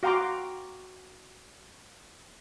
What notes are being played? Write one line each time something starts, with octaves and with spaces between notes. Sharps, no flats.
F#4 F5 G5 A#5 C6 D6